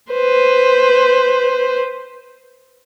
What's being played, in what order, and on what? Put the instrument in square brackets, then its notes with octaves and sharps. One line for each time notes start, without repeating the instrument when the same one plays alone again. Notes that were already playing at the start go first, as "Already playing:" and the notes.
[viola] B4 C5